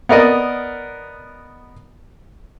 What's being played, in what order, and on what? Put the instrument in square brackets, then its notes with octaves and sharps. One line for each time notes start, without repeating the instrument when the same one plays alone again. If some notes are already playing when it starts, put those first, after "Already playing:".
[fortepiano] B3 A#4 D5 D#5